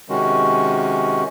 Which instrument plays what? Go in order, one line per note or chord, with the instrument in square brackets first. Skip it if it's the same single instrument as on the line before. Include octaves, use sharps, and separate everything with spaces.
[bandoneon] C3 D#3 G#3 C#4 F#4